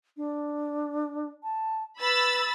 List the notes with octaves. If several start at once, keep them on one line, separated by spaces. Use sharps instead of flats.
D4
A5
B4 B5 E6 A6